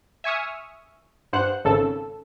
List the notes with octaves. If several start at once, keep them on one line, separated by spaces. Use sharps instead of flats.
E5 G#5 C#6 D#6 F6
G2 C5 F#5 F#6
G#1 C#3 A4